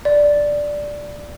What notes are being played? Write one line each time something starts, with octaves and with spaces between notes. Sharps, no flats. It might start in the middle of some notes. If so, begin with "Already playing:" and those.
D5